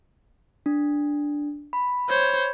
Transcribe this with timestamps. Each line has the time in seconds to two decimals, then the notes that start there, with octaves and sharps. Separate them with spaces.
0.66 D4
1.73 B5
2.09 C5 C#5